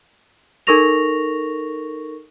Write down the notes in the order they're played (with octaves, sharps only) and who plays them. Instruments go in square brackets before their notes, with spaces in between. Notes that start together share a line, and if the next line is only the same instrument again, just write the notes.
[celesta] D#4 A4 A#4 C#6 A#6 F7